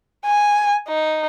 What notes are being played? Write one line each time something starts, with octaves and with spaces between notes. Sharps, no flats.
G#5
D#4